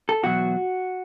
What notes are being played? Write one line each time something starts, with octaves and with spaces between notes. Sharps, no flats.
A4
E2 B2 F#3 F#4